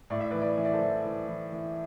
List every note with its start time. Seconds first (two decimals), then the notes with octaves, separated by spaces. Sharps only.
0.10 A2 D5
0.21 E5
0.31 B4 D5
0.34 E3
0.42 B4 D5
0.58 E3
0.65 D5
0.73 A4 C5
0.81 E3
1.05 E3
1.28 E3
1.52 E3